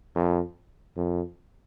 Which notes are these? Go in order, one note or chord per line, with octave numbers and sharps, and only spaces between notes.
F2
F2